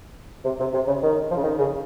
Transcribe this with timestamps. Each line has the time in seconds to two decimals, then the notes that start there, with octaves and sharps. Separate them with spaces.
0.45 C3
0.60 C3
0.74 C3
0.88 C#3
1.02 D#3
1.31 F3
1.37 C#3
1.44 D#3
1.59 C#3